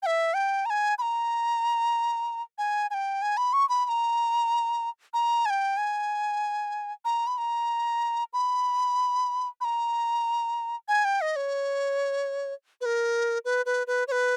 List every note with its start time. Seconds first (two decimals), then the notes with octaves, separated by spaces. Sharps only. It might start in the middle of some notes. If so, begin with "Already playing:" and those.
0.03 G5
0.06 E5
0.34 G5
0.66 A#5
0.70 G#5
0.98 B5
1.02 A#5
2.58 G#5
2.90 G#5
2.94 G5
3.22 G#5
3.37 B5
3.53 C#6
3.69 B5
3.85 B5
3.89 A#5
5.14 A#5
5.46 G#5
5.50 G5
5.77 G#5
7.05 A#5
7.27 B5
7.38 A#5
8.33 B5
9.61 B5
9.64 A#5
10.88 G#5
11.05 G5
11.21 D#5
11.36 C#5
12.81 B4
12.86 A#4
13.45 B4
13.66 B4
13.87 B4
14.08 C#5
14.12 B4